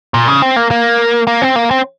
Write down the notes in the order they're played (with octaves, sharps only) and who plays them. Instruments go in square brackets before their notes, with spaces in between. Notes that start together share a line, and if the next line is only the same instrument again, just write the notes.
[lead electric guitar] A#2
C#3
C4
A#3
A#3
A#3
C4
A#3
C4